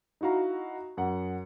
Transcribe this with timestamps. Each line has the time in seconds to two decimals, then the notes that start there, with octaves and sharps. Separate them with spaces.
0.21 D#4 E4 F#4 F5 A#5
0.97 F#2 F#5